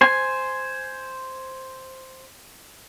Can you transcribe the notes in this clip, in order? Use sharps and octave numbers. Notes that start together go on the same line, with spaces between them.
C5 G#5